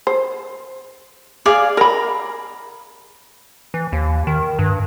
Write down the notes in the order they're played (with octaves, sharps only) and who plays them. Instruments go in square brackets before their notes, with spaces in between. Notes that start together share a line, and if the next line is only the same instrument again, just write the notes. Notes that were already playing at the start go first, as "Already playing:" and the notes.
[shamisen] C5
[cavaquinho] G#4 D5 F5
[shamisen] A#4 B5 [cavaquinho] A#5
[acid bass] E3
D#2
D#3
G2